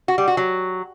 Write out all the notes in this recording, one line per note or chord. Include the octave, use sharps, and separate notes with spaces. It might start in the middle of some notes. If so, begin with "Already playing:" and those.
F#4
G3
F#4
F#3